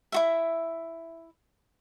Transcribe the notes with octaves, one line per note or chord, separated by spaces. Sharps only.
E4 F#4 E5